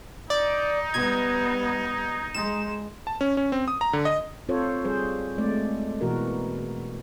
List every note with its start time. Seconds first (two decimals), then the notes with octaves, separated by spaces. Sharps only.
0.30 D#4 D5
0.94 G3 B3 G#6
2.34 G#3 E7
3.07 A5
3.21 C#4
3.37 C#4
3.52 C4
3.68 D#6
3.81 A#5
3.93 D3
4.05 D#5
4.49 C4 F4 A4 C5 C#5
4.85 G3 G#4 C5
5.38 G#3 A3 C4 D5
6.01 B2 E3 F#4 A#4